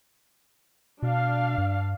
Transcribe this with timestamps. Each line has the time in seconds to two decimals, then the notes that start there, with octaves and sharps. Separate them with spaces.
1.03 B2 D4 F5
1.58 G2